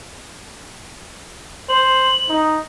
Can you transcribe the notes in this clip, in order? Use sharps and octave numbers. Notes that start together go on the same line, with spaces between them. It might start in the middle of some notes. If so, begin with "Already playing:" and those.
C5 F#7
D#4